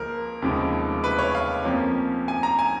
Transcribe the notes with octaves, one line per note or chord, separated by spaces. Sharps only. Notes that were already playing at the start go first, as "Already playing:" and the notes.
Already playing: C#2 F3 A#3 A#4
F1 D#2 C#3 F3 G#3
B4
C#5
F5
F2 F3 A#3 C#4
G#5
A#5
G#5